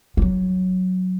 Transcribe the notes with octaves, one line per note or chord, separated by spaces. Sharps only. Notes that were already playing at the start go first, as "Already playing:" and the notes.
F3
F#3